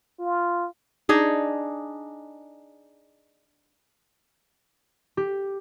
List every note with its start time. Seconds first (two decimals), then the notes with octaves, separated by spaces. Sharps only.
0.19 F4
1.09 D4 D#4 G#4
5.17 G4